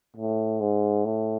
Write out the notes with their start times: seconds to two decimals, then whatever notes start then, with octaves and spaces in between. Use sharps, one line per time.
0.16 A2
0.60 G#2
1.05 A2